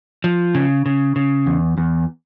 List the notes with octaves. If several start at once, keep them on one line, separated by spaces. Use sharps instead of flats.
F3
C#3
C#3
C#3
E2
E2